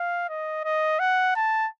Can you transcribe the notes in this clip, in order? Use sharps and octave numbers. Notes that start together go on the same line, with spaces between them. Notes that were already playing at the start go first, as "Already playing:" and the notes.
Already playing: F5
D#5
D#5
F#5
A5